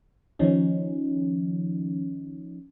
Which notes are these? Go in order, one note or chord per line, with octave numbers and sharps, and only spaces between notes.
D#3 F3 C#4 D#4